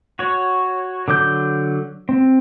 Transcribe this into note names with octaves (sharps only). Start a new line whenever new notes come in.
F#4 C#5
D3 F#3 D6 G6
C4